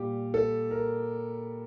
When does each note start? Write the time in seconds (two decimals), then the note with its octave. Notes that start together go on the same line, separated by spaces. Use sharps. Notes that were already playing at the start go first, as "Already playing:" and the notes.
Already playing: A#2 G3 G4
0.34 A4
0.71 A#4